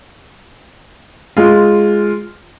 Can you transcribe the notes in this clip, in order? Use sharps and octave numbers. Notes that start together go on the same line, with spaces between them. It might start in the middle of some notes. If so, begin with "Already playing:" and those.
G#3 F4